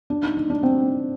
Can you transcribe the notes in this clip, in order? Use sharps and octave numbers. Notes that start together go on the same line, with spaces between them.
D4
D#4
D#4
D4
C4